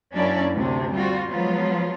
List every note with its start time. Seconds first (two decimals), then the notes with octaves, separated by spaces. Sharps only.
0.13 F#2 A#3 C#4 D4 E4 D5
0.54 D2 C3 D4
0.93 G3 C4 F4 F#4
1.29 F3 F#3 G#3 B3 F4